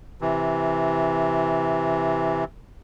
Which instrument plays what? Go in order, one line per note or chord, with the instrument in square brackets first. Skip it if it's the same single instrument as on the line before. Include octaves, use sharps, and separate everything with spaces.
[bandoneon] C3 E3